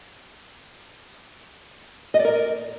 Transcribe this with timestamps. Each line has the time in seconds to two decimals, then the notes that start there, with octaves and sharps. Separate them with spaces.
2.14 D#5
2.19 D5
2.25 A#4